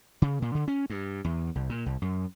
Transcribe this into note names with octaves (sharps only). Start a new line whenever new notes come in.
C#3
A#2
D3
C#4
G2
E2
C2
A#2
C2
F#2